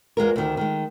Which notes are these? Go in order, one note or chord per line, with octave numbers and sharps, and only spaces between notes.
E2 G#3 F4 A#4
D2 D#3
D#3 G#3